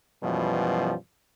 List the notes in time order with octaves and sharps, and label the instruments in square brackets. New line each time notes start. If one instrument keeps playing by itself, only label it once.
[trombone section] F#2 B2 E3 F3 G3